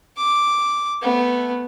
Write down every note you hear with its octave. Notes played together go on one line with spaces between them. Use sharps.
D6
A3 B3